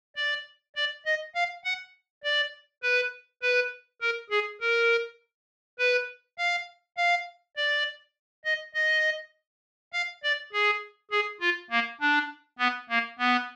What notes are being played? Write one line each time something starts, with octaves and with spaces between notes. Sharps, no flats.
D5
D5
D#5
F5
F#5
D5
B4
B4
A#4
G#4
A#4
B4
F5
F5
D5
D#5
D#5
F5
D5
G#4
G#4
F4
A#3
D4
B3
A#3
B3